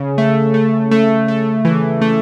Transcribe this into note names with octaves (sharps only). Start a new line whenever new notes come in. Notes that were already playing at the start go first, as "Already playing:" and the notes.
Already playing: C#3
A3
A3
A3
A3
E3
A3